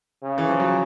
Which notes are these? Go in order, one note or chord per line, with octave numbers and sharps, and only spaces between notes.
C#3
E3
F3
F#3